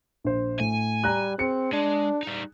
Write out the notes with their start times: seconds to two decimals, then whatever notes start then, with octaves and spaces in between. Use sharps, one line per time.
0.24 A#1 C5
0.60 A2 G#5
1.04 G3 A#5 F#6
1.39 C4 G#4 C#7
1.73 G#3 D4
2.23 G3 D#4